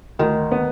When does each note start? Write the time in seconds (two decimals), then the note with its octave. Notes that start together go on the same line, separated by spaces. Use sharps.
0.19 D2 D#3
0.52 B3